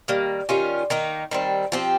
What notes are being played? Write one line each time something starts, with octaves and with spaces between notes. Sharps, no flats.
D#3 G3 A#3
D#3 G3 C#4 F4
D#3 A#3 D#4
D#3 G3 C4
F3 C4 G4